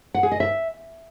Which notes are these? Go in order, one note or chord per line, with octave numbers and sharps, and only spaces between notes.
F#5
G#4
D#5
E5